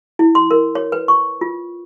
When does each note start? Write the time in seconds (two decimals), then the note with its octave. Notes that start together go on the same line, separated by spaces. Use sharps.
0.19 E4
0.35 C6
0.51 A#4
0.75 C#5
0.92 B4
1.08 C#6
1.41 F4